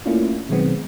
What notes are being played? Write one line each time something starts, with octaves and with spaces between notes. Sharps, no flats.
A3 A#3 C#4 D4 E4 F4
B2 D#3 F#3 G#3 B3 C4